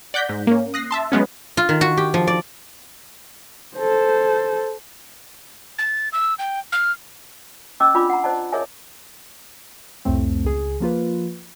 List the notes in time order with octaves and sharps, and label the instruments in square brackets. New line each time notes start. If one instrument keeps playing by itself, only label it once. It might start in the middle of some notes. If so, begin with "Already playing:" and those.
[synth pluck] D5 F#5 F#6 G6 A#6 B6
G#2
A#3 C#4
D#6 F#6 A#6 C7
E5 A5 C6
F#3 G#3 B3 C#4
[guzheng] F4
D#3
F#4
G4
F3
D5
[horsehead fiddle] A4 C5
[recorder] A6
E6
G5
F6
[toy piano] C#4 D#5 D6 E6
D4 F4 D5 B5 D6
F#5 A#5
C5 D5 D#5 A5
G#4 A#4 C#5 D#5 E5 G#5
[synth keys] C2 F2 A2 A3 C4
C#2 G#4
F3 A#3 F4 B4